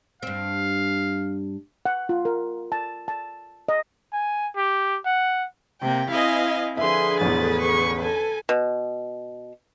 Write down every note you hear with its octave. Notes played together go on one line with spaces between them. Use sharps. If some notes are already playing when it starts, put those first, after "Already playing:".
G2 C4 F5
F#5
F4
A#4
A5
A5
D#5
G#5
G4
F#5
C3 A#3 G5
C4 E4 D#5 F5 G#5
D3 F3 G#4 B4 E5 G#5 C6
A1 E2 A6
C#6
A4 G#5
B2